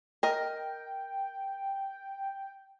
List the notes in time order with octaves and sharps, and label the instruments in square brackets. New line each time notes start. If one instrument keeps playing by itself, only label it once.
[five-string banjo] A#4 D#5 [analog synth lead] G5